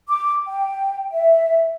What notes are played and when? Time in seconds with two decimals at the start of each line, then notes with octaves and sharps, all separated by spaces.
0.08 D6
0.47 G5
1.11 E5